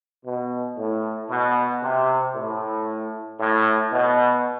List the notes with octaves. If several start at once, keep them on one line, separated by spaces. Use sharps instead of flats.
B2
A2
B2
C3
A2
A2
B2